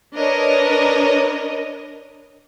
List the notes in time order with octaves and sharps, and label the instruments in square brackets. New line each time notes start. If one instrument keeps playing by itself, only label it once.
[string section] D4 A#4 B4 C#5 D#5